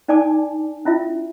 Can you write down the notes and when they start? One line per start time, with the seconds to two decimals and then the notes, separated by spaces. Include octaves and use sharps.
0.08 D4 D#4 D5 G#5 A5 D6
0.85 C#4 E4 F4 E5